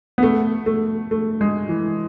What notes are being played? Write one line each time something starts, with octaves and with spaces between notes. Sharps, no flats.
B3
A3
A3
A3
G#3
E3